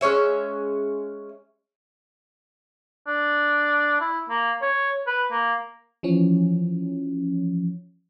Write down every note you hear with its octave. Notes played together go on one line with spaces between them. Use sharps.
G#3 C#4 C#5 E5
D4
E4
A#3
C#5
B4
A#3
E3 F3 C#4